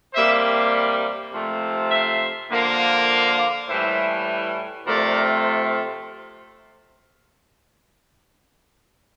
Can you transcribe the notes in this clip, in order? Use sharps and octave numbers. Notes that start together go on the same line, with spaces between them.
C3 G3 A#3 C5 E5
C3 F3 A3
C5 E5
D3 F3 A#3
D5 F5
A2 E3 G3 C5 E5
C3 F3 A3 A#4 D5